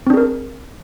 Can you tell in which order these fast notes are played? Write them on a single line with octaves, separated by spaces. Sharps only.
C4 D4 G#4 A#4